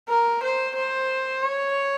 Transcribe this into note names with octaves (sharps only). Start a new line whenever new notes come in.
A#4
C5
C5
C#5